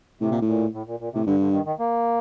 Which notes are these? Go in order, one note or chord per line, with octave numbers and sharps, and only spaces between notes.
A2 C3
A#2
A2
A#2
A2
A#2
A#2
A2 C3
G2 D3
D3
D#3
D#3
A#3